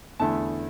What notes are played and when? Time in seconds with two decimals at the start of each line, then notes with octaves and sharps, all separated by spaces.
0.19 E2 D3 A3 E4 A5